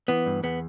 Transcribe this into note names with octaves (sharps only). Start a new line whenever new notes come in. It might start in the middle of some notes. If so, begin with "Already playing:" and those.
E3 B3
G2
E2 B3